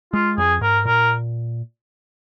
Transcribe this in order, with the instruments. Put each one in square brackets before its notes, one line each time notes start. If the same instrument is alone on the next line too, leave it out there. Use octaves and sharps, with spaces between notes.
[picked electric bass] G#3 [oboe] F4
[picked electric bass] F2 [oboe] G#4
[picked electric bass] G#2 [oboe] A#4
[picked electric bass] A#2 [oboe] A#4